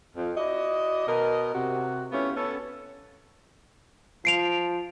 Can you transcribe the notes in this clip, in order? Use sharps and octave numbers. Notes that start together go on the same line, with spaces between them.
F2
E4 F#4 D5 D#5
B2 A#4 D#5
C3 F#4
A3 B3 C#4 E4 F4 G4
B3 C#4 A4
F3 C7 D7 F7